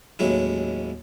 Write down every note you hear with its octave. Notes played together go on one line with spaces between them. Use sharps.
A1 D#2 F#3 G#3 E4